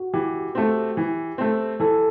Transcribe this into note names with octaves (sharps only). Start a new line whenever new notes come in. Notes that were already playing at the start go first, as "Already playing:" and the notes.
Already playing: F#4
E3 G4
A3 C4
E3
A3 C4
E3 A4